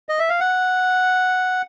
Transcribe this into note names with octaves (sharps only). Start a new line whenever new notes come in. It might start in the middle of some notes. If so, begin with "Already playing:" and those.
D#5
E5
F5
F#5